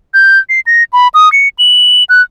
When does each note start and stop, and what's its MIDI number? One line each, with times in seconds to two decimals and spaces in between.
0.14 0.39 91
0.49 0.60 96
0.67 0.84 94
0.93 1.08 83
1.14 1.31 87
1.32 1.49 97
1.59 2.04 102
2.09 2.22 90